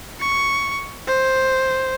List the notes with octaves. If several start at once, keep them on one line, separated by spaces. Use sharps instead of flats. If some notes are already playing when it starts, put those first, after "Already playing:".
C#6
C5